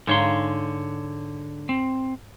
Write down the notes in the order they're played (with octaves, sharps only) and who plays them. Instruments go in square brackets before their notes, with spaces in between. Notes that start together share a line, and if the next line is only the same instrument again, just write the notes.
[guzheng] G#2 F5 [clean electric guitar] D3 C#5 C6
[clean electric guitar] C4